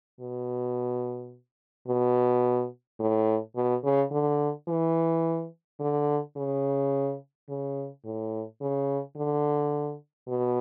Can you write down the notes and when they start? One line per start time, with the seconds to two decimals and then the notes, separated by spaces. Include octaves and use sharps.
0.20 B2
1.88 B2
3.00 A2
3.56 B2
3.84 C#3
4.12 D3
4.68 E3
5.80 D3
6.36 C#3
7.49 C#3
8.05 A2
8.61 C#3
9.17 D3
10.28 B2